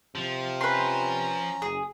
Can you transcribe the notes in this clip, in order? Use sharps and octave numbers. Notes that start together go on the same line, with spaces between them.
C3 F3
C#4 B4 A#5 C6
F#1 G#4